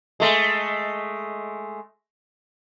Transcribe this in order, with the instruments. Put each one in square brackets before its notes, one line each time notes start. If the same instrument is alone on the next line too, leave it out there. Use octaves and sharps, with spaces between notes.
[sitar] G#3 A3